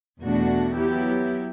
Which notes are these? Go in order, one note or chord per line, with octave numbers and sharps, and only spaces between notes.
E2 B2 A3 D4 F#4
F#3 B3 E4 G4